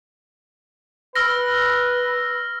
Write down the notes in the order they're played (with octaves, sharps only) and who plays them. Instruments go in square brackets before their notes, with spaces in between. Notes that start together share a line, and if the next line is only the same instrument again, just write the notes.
[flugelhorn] B4 [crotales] E6 F6 A#6